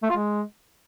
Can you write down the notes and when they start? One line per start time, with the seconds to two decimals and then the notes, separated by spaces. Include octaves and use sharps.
0.03 A3
0.10 F4
0.16 G#3